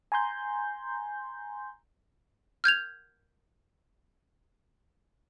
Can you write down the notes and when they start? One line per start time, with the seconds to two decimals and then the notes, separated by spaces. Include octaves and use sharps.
0.12 G#5 A#5 C6 G6
2.64 F6 G6 G#6 F7